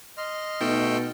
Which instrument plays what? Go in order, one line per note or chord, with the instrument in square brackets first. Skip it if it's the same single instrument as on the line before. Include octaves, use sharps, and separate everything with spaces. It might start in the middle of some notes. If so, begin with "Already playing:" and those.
[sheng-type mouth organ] D#5 C6 F6
[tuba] B2 [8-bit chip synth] A3 A4 G5 [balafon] D#4